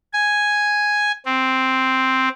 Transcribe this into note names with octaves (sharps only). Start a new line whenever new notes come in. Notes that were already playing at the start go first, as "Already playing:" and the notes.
G#5
C4